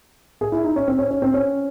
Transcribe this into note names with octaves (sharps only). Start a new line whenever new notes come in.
G#4
E4
D#4
C#4
C4
C#4
C#4
C4
C#4